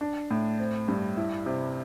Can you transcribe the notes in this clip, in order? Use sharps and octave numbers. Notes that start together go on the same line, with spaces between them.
D4
A2
C4
G2
E4
C3